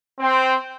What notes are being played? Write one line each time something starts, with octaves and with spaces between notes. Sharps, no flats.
C4